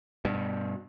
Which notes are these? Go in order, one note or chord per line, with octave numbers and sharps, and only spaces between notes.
G2 B2